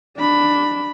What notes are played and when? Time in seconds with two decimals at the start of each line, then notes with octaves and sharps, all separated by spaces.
0.17 D4 B5